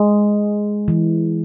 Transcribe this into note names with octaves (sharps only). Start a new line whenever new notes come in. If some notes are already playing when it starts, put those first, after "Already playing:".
Already playing: G#3
E3